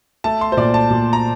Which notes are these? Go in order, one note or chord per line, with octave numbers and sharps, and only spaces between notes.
A3 A5
C6
C5
A#2 D5
A5
A#2
A#5